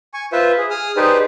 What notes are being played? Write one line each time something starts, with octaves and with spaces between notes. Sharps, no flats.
G#5 C#6
F4 B4 C5 E5
G#4
G#4 D#6 F6
D#4 G4 G#4 B4 C5 D5